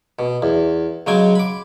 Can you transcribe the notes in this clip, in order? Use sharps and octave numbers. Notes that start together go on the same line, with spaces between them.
B2
E2
C#3 F#3 G#3 G5 G#5
B5 D6